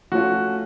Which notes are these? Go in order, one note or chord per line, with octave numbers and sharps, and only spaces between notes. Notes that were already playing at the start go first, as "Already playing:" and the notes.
F3 A3 C#4 F4 F#4